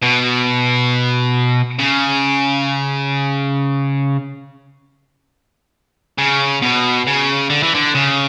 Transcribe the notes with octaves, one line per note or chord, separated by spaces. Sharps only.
B2
C#3
C#3
B2
C#3
D3
E3
D3
C#3